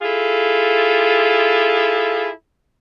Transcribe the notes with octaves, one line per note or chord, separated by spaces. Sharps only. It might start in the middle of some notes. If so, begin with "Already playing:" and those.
E4 F4 G#4 A4